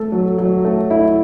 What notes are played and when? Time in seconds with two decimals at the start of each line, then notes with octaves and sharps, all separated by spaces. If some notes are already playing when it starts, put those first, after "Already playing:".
Already playing: A3 A4
0.12 F#3
0.38 F#3
0.65 A3
0.91 E4